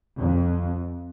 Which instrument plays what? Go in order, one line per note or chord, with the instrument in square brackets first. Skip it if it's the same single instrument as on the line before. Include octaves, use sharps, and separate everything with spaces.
[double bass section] F2